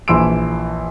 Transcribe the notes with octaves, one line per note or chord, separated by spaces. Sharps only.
A#1 E3 F3 C6 E6 D7